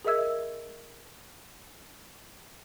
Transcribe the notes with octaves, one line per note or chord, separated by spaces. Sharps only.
G#4 A#4 D#5 E5 E6 G#6